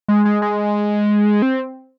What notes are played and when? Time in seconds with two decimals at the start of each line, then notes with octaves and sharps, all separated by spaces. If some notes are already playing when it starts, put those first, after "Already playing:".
0.08 G#3
0.25 G#3
0.42 G#3
1.42 C4